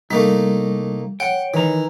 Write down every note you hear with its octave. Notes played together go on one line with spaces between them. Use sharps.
C2 G3 A3 A#3 D#4
C#5 F#5 G5
D#3 E3 A#5